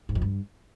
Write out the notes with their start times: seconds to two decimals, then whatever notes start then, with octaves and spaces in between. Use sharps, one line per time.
0.09 G#2
0.15 F2
0.22 G2